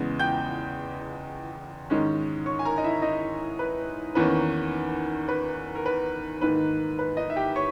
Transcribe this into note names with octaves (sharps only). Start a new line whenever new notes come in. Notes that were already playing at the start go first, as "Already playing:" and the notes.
Already playing: E2 C#3 G#3 B3
G5 G6
G#2 D#3 G#3 C#4
C#5 C#6
G#5
A#4 A#5
D#5
E4 E5
D#4 D#5
B4
E2 D#3 A#3 C#4 B4
B4
A#4
B4
G#2 D#3 A#3 B4
B4
D#4 D#5
E5
G4 G5
C#5 C#6